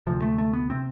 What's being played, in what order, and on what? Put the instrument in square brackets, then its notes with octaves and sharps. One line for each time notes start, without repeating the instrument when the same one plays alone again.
[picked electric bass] D2 C3 F3
A3
A3
B3
C3 C4